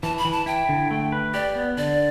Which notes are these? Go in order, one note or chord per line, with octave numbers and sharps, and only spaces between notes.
E3 A5
B5
E3
A5
E4 G5
D3
A3
B4
G4 D5
B3
D3 D5